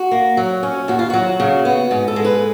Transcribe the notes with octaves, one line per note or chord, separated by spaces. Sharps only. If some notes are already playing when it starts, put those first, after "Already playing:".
Already playing: F#4
A#3
F#3
C#4
D#2 F#4
F4
F#3 F#4
C#3
B3
G#2
A4
G#3
B4